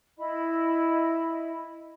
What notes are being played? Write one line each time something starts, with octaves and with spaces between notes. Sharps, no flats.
E4 D#5 B5